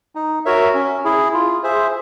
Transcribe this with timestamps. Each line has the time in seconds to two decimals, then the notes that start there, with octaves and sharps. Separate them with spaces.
0.15 D#4
0.45 F#4 A#4 C#5 E5
0.74 C#4
1.05 E4 G#4
1.34 F4
1.64 G#4 C5 E5